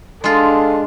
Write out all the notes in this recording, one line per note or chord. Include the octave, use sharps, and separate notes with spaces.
G#3 D4 F4 A4